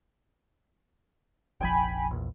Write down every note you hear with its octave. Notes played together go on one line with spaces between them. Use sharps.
F1 A#1 F3 G5 G#5 B5
A#1 E2